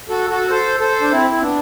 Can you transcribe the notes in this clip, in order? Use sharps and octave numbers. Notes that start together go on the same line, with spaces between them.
F#4 A4
F#4 A4
A4 C5
A4 C5
D4
C4 E4
C4
B3 D4